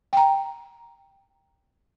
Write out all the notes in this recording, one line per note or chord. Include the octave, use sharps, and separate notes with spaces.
G5 A#5